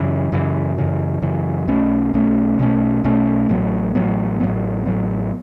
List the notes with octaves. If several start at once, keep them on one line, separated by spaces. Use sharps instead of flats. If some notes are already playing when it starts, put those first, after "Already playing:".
Already playing: F#2 C#3 E3
F#2 C#3 E3
F#2 C#3 E3
F#2 C#3 E3
B1 B2 A3 C#4
B1 B2 A3 C#4
B1 B2 A3 C#4
B1 B2 A3 C#4
A1 A2 F#3 B3
A1 A2 F#3 B3
A1 A2 F#3 B3
A1 A2 F#3 B3